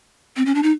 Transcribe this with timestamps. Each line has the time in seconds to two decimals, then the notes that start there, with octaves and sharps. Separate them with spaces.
0.37 C4
0.46 C#4
0.55 D4
0.63 D#4